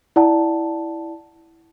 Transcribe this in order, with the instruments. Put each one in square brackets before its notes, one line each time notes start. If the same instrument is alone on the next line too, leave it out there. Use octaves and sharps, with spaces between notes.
[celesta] E4 D5 F#5 A5